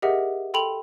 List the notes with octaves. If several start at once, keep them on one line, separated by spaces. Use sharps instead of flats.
G4 G#4 A#4 D#5 E5 F#5
A4 G5 B5 C6 F7 F#7